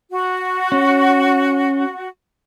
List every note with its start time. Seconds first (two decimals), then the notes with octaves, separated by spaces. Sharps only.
0.11 F#4
0.72 C#4